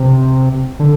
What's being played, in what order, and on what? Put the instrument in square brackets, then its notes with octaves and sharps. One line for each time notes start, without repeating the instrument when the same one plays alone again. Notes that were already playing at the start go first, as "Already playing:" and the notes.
Already playing: [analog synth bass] C3
D3